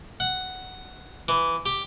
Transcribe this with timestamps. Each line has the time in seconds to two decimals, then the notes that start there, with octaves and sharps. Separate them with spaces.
0.20 F#5
1.28 E3
1.66 G4